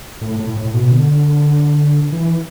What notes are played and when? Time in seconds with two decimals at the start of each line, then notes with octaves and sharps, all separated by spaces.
0.21 A2
0.39 A2
0.57 A2
0.74 B2
0.91 D3
2.12 E3